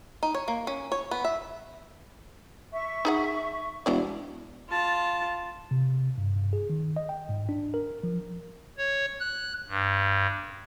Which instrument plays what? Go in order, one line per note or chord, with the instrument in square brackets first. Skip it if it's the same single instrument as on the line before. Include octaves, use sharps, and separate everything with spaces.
[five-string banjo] D#4
C#5
A#3
C#4
C#5
B3
E5
[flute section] E5 C#6
[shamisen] D#4 G#4 F#5
[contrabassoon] E1 [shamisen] F#3 B3 D5
[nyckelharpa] F4 A5
[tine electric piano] C3
G2
G2
G#4
D#3
D#5
G5
G#2
D4
A#4
F3
[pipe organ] C#5
F#6
G2